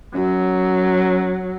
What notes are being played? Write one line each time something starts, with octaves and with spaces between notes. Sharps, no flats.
F#2 F#3